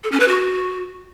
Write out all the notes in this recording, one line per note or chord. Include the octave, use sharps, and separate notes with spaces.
A4
C#4
B4
F#4